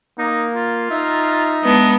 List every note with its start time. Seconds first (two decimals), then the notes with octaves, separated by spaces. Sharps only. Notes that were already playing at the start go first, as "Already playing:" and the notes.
0.18 A#3 D#4
0.55 F4
0.91 D#4 E5 A#5
1.62 G#3 B3 D4 D#5